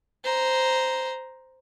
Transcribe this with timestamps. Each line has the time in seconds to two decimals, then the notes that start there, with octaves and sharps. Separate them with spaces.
0.24 C5 A#5